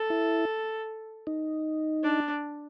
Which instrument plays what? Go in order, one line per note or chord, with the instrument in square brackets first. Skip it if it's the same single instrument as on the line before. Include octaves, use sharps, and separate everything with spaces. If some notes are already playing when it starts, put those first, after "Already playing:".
Already playing: [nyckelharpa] A4
[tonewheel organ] E4
D#4
[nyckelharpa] D4